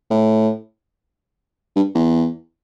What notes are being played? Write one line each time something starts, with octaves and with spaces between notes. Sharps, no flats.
A2
G2
E2